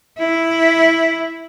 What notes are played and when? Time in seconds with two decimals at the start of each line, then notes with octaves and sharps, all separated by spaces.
0.19 E4